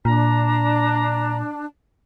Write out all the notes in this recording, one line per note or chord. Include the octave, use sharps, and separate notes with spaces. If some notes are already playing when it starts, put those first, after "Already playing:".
A#2 D4 A#5